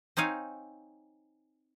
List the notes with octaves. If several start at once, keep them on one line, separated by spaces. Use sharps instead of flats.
C4 D#4 C#5 F5 G#5